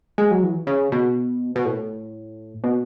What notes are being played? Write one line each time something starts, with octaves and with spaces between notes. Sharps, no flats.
G#3
F#3
E3
C#3
B2
B2
A2
B2